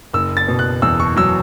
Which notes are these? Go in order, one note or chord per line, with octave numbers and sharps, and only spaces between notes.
F#1 E6
A6
B2
F#6
E2 E6
C#6
F#3 E6